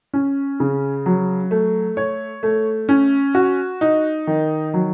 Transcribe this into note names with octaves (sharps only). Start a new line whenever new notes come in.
C#4
C#3
F#3
A3
C#5
A3
C#4
F#4
D#4
D#3
F#3